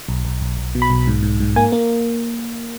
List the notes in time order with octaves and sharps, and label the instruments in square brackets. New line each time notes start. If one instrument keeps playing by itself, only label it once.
[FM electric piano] B1
B1
B1
B1
B2
B5
B1
G#2
G#2
G#2
A#3 G#5
A#3